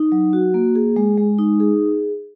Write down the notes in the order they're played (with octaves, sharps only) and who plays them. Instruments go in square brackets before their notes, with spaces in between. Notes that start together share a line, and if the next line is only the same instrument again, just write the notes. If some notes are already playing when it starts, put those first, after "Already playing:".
Already playing: [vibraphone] D#4
F#3
F#4
A#3
G#4
G#3
G#3
D#4
G#4